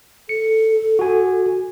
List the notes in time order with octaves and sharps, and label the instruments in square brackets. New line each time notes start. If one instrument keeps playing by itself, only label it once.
[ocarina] A4 [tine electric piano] C#7
[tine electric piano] F#4 G#5